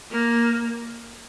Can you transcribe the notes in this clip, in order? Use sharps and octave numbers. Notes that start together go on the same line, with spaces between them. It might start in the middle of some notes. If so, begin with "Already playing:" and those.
A#3